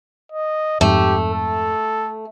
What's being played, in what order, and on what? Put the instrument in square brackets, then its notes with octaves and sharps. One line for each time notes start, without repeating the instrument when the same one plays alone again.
[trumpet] D#5
[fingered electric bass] F2 G#2 [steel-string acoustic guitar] A3 [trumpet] G4
[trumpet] A4